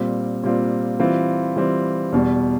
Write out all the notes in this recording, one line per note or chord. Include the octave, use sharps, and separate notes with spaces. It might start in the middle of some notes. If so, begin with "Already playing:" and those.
Already playing: A#2 G3 C4 F4
A#2 G3 C4 F4
E3 G3 C4 F4
E3 G3 C4 F4
E2 B2 G3